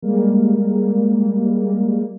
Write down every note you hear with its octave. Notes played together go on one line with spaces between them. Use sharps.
G3 G#3 A#3